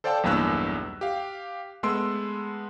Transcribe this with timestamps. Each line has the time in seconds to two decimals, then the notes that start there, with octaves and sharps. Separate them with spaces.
0.04 A4 C5 D5 F5 G5 A5
0.23 B1 E2 G2 A#3 E6 F#6
1.01 G4 F5
1.83 G#3 A3 B3 C6 E6 D7